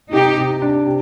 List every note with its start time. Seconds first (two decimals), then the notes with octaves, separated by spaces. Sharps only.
0.12 C3 D#4 G4
0.37 C3
0.62 D4
0.86 C3